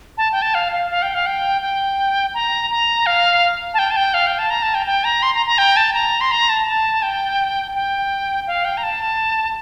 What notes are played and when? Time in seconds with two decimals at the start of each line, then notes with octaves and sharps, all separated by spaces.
0.18 A5
0.32 G5
0.42 A5
0.54 F5
0.72 F5
0.90 F5
1.02 G5
1.14 F5
1.26 G5
1.62 G5
2.34 A#5
2.70 A#5
3.06 F5
3.74 A5
3.79 G5
3.91 A5
3.96 G5
4.14 F5
4.27 G5
4.39 A5
4.50 A#5
4.63 A5
4.75 G5
4.86 G5
5.04 A#5
5.23 C6
5.35 A#5
5.46 A#5
5.58 G5
5.77 A5
5.94 A#5
6.21 C6
6.31 A#5
6.49 A5
6.67 A5
7.02 G5
7.75 G5
8.47 F5
8.65 G5
8.77 A#5
8.83 A5